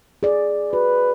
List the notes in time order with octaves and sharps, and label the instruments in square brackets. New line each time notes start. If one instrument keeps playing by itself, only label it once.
[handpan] G#4 D5
[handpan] F#4 [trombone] B4